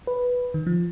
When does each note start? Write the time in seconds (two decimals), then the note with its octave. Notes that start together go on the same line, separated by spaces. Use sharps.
0.07 B4
0.54 D#3
0.67 F3